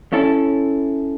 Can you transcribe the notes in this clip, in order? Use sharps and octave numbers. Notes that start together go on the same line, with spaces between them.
C#4 E4 A4